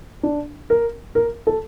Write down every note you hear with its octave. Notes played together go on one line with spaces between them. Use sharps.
D4
A#4
A#4
A4